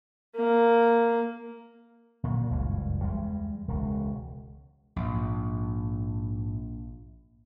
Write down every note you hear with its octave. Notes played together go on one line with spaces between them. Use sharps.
A#3
A#2 D3 F#3
F#1 C#2 G2 E3
E2 G3 G#3
E1 C#2
A#1 G#2